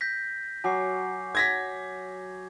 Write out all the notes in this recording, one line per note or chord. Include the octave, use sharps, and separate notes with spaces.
G6 A#6 B6
F#3 G#5 D6 C7
G#6 A#6 B6